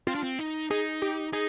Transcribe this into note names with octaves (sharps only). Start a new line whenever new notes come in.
C4 F4
D4
C4
D#4
D#4 G#4
G4
D#4 G#4